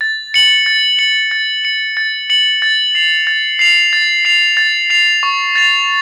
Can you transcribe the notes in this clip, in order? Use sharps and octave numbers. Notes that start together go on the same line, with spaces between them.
A6
C#7 F#7
A6
C#7 F#7
A6
C#7 F#7
A6
C#7 F#7
A6
C7 F7
A6
C7 F7
A6
C7 F7
A6
C7 F7
C#6
A6 C7 F7